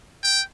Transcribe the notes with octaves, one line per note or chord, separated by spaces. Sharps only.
G5